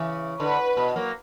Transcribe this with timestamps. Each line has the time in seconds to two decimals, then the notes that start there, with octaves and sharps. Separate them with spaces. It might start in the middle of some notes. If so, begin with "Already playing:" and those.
Already playing: C#3 E3
0.40 D3 B4
0.77 B2
0.96 F#3 A#3